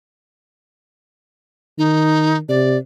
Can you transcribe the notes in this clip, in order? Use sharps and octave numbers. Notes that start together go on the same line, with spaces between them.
D#3 D#4
C3 D5